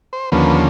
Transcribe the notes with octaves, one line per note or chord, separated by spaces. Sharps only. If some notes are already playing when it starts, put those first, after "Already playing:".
C5
D#2 D3 F3 A#3 C#4 B4